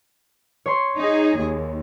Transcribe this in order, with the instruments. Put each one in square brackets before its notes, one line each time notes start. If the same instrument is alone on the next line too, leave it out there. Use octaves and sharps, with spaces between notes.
[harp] C#5 C6
[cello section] D#4 G#4
D#2